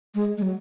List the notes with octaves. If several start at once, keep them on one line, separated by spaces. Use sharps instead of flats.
G#3
G#3
F#3